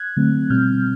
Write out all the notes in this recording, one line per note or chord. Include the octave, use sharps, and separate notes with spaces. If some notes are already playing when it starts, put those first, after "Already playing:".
Already playing: F#6 G#6
D3 F#3 A3 C4
B2 G3 C4 F6 G6